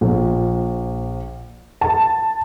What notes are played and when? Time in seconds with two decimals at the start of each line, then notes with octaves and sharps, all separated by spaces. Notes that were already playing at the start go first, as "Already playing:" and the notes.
0.01 A#1
1.81 A5